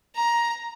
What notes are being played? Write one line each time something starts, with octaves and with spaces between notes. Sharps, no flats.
A#5